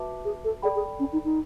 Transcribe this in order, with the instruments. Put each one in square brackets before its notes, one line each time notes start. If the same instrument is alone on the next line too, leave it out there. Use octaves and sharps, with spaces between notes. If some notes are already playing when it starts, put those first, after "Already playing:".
Already playing: [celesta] F#4 B4 E5 A5 D6
[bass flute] G#4
A4
[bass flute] G#4 [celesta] A4 D5 G5 B5
[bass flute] G#4
C#4
D#4
D#4